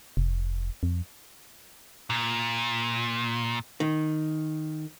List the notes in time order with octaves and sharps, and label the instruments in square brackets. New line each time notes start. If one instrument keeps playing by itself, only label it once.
[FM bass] F1
F2
[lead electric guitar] A#2
[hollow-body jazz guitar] D#3